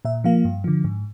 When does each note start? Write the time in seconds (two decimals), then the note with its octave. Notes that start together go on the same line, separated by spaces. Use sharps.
0.05 A#2 E5
0.24 F3 A#3 F5
0.45 G2
0.64 D3 F3
0.84 G#2